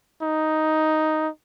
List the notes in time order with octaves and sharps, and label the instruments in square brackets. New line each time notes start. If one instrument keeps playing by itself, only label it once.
[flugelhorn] D#4